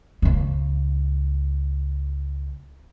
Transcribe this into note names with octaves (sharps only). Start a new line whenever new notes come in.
C#2 A#3